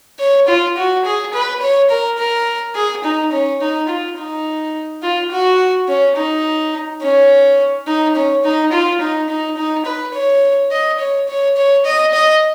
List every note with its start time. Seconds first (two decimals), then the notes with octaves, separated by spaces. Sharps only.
0.19 C#5
0.48 F4
0.77 F#4
1.05 G#4
1.34 B4
1.62 C#5
1.90 A#4
2.18 A#4
2.75 G#4
3.04 D#4
3.32 C#4
3.61 D#4
3.89 F4
4.17 D#4
5.03 F4
5.31 F#4
5.88 C#4
6.16 D#4
7.02 C#4
7.87 D#4
8.15 C#4
8.44 D#4
8.72 F4
9.01 D#4
9.29 D#4
9.57 D#4
9.86 B4
10.14 C#5
10.71 D#5
10.99 C#5
11.28 C#5
11.57 C#5
11.85 D#5
12.13 D#5